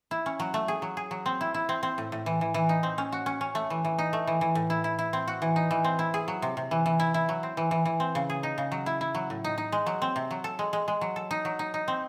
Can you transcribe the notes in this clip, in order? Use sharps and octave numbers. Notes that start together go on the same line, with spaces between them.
E4
C#4
F#3
A3
G#4
F#3
G#4
F#3
C4
E4
E4
C4
C4
A2
A2
E3
E3
E3
D#4
C4
C#4
F#4
C#4
C#4
A3
E3
E3
D#4
A3
E3
E3
A2
E4
E4
E4
C4
F#4
E3
D#4
E3
C4
E4
G#4
F#3
C3
C3
E3
E3
E4
E4
F#3
C4
E3
E3
E3
C4
C#3
G#4
D#4
C#3
F#3
E4
E4
F#3
A2
D#4
D#4
G#3
F#3
C4
C3
F#3
A4
G#3
G#3
G#3
F#3
A4
D#4
F#3
D#4
D#4
C4